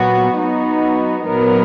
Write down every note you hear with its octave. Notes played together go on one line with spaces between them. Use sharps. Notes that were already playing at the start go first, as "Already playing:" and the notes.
Already playing: A#2 F#3 B3 F#4
F#3 B3 D#4 F#4
A#2 F#3 B3 D#4 A#4